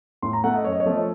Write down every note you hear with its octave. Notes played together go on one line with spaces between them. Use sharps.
A2 C6
A#5
A3 F#5
D#5
F#2 C#5
D#5
C#5
F3 A3 D#5
C#5